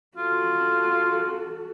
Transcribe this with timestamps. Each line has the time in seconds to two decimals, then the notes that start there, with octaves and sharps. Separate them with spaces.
0.17 F4 F#4 A4